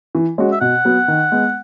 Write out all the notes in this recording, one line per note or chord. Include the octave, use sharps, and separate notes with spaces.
E3
G#3 C#4 F#4
E5
B2 F#5
F#3 B3
D#3
G#3 B3